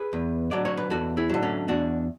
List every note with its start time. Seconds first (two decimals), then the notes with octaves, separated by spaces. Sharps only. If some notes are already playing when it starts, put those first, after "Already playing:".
Already playing: G#4 B4
0.13 E2
0.51 D3 F#3 D5
0.65 C#5
0.77 B4
0.90 E2 F#4 A4
1.17 E4 G#4
1.29 D3 F#3
1.43 A3 C#4
1.68 E2 D4 F#4